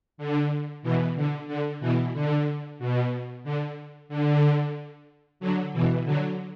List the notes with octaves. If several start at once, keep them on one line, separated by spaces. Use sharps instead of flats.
D3
B2 E3
D3
D3
B2 E3
D3
B2
D3
D3
D3 F#3
B2 E3
D3 F#3